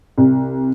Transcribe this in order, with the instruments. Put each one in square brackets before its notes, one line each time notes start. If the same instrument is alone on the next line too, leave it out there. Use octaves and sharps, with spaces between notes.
[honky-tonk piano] C2